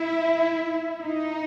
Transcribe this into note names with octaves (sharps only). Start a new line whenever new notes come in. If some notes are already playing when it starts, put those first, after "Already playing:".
Already playing: E4
D#4